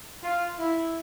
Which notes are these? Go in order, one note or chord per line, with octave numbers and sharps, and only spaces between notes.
F4
E4